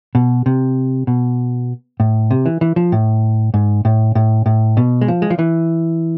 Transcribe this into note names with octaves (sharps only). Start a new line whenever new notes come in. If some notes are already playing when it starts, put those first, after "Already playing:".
B2
C3
B2
A2
C3
E3
E3
F3
A2
G#2
A2
A2
A2
B2
G#3
F3
G#3
F3
E3